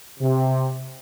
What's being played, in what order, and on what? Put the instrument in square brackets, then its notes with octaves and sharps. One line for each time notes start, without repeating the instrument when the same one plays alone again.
[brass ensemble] C3